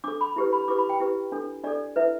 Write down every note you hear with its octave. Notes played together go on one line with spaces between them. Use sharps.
D4 A4 D6
B5
E4 G4 B4
B5
E4 G4 B4 D6
B5
G5
E4 G4 B4
D4 A4
D4 A4 D5
E4 B4 E5